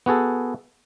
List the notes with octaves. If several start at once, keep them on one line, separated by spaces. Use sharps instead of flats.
B3 F#4 G#4 A4